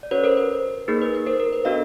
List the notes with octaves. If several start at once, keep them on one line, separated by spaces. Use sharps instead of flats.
D5
C#4 F#4 A4 B4 C#5
A#4 C5
B4
A#3 D#4 G#4 A#4
B4
B4
A#4 C5
A#4
B4
B3 D4 F#4 A4 D#5 F5